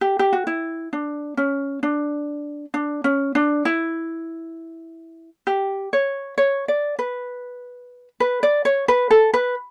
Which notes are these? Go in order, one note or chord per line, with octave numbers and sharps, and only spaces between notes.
G4
G4
F#4
E4
D4
C#4
D4
D4
C#4
D4
E4
G4
C#5
C#5
D5
B4
B4
D5
C#5
B4
A4
B4